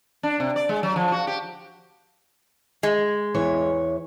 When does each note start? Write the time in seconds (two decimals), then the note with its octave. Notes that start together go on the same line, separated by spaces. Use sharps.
0.23 D4
0.40 C3
0.56 D5
0.69 G#3
0.83 F#3
0.96 F3
1.12 F#4
1.27 G4
2.83 G#3
3.34 E2 E3 C#5